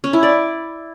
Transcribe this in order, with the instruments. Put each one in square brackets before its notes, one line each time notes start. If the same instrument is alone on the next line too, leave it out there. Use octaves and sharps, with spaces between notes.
[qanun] C#4
E4
D5